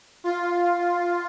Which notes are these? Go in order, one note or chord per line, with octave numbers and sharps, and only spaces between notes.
F4